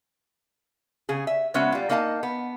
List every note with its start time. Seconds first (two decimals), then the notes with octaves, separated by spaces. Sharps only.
1.09 C#3 G#4
1.27 E5
1.54 C#3 G#3 B3 C#4 F#4 E5
1.72 G3 F4
1.89 A#3 D#4 D#5 F5 A5
2.23 B3